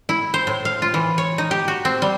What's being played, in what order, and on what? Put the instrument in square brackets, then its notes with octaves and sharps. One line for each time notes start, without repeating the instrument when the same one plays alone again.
[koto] E4
C5
A2
F5
F4
E3
C#5
D#4
G4
F#4
C4
G3